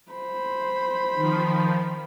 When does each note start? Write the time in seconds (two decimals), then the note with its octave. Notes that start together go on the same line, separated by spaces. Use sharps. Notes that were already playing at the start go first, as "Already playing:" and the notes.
0.12 C5 B5
1.15 D#3 F3